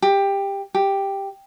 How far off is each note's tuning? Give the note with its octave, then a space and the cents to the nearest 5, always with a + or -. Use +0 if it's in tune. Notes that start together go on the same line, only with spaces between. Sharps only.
G4 +15
G4 +5